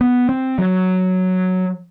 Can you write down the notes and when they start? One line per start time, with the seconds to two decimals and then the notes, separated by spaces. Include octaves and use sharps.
0.01 B3
0.29 C4
0.58 F#3